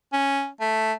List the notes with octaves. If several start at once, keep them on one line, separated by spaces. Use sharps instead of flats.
C#4
A3